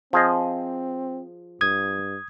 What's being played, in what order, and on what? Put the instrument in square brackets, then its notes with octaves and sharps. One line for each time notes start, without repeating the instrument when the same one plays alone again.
[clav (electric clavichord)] F3 G#4 D#5 [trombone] C4
[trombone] G2 [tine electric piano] D#6 G#6